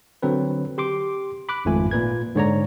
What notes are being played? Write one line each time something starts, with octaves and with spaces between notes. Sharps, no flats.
D3 F#3 C4 B4
G4 C6 D6
B5 D6 F#6
G#1 F2 G#2 A3 F4 G#5
A#2 B4 G#6
G#2 D3 C#5 D5 A#5